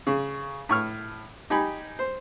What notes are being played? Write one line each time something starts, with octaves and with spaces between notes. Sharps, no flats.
C#3
A2 C#6 F6
D#4 G4 G#5 B5
C5